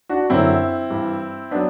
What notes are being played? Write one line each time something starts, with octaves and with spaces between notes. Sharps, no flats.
D4 F#4
F#2 D3 F#3 C4 E4
G2 E3 G3
F#3 B3 D4